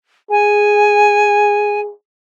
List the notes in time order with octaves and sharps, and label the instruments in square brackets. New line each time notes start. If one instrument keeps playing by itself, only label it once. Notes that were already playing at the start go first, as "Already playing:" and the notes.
[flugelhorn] G#4 [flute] G#5